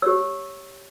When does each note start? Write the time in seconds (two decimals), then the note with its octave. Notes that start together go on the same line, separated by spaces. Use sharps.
0.02 G4 C#5 E6